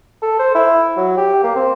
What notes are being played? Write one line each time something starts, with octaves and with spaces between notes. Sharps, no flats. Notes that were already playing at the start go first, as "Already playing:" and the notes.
A4
C5
E4
F#3
G4
A#3
C4